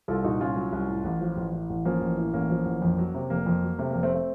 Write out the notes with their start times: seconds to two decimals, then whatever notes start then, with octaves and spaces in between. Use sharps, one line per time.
0.08 C2 F4 A4
0.24 A#2 D#4 F#4
0.41 C2 C#4 F4
0.56 F#3
0.73 C2
0.89 A2
1.04 A1
1.21 F3
1.37 A1
1.53 A2
1.70 A1
1.85 F3 A#3 C#4
2.01 A1
2.17 A2
2.33 A1 A#3 C#4
2.50 F3
2.66 A1
2.82 F2
2.98 F#3
3.14 C3
3.30 F1 A#3
3.46 F2
3.63 F#3
3.79 C3 A3
3.91 F1 A#3
4.03 A3 C4
4.14 A3 C4